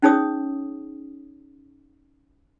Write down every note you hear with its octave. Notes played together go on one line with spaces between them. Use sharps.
C#4 D#4 G#4 C#5 D#6